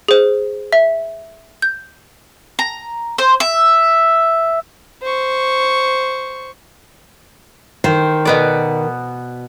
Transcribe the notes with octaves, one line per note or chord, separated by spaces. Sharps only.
G#4 C5
E5
G6
A#5
C5
E5
C5 C#6
D#3 C5
B2 B3 D5